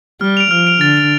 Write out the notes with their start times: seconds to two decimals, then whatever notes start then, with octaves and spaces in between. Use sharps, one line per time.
0.21 G3 F6
0.37 D7 F7
0.51 F3 F6
0.67 D7 F7
0.81 D3 A6
0.97 F7